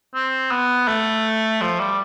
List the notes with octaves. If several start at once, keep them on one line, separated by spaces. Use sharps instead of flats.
C4
B3
A3
F3
G3